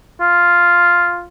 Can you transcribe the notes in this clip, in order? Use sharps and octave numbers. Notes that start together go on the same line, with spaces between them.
F4